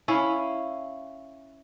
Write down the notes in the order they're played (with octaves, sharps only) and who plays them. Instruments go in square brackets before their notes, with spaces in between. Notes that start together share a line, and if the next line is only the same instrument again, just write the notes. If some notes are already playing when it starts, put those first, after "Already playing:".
[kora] C#4 E4 F5